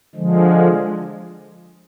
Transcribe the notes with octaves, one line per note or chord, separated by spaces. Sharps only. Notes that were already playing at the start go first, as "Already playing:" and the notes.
D3 F3 G#3